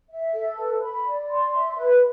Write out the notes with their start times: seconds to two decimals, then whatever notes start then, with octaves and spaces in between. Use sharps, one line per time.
0.10 E5
0.34 A4
0.58 B4
0.81 B5
1.05 D5
1.29 C6
1.53 E5
1.77 B4